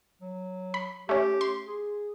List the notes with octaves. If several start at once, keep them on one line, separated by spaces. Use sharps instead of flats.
F#3
B5
A3 C#4 G4
C6
G#4